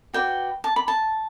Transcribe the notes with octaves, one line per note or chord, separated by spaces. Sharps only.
F#4 B4 D5 G5
A5
B5
A5